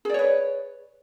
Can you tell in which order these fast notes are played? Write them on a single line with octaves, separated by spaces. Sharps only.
G#4 D5 C#5 B4